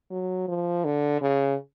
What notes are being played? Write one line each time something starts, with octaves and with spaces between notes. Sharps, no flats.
F#3
F3
D3
C#3